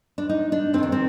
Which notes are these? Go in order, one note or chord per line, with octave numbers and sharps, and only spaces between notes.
D4
D#4
D4
F2 D#3 C4 D4
C4